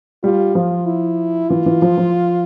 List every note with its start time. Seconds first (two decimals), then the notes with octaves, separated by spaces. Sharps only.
0.24 G3 F4
0.55 F3 F4
0.86 E4
1.49 E3 F4
1.66 E3
1.82 F3
1.98 F3